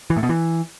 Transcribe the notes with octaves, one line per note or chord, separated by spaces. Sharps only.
E3
A2
B2
E3